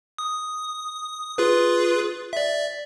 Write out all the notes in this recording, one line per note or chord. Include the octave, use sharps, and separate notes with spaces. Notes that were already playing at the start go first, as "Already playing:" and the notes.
D#6
F4 G#4 B4
D5 E5